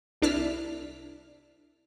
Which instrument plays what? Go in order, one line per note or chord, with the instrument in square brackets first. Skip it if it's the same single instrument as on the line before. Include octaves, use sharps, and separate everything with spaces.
[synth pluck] C2 D4 E4 A5 F6 B6